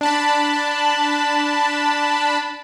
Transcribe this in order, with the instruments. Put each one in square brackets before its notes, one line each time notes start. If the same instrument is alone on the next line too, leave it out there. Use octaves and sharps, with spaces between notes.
[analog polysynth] D4 A5 B5